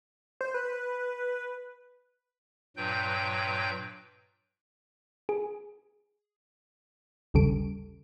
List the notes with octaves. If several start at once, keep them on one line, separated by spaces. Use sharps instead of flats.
C5
B4
G2 A#2 F#3 B4 G5 G6
G#4
A1 D#2 C#3 G3 A4 D7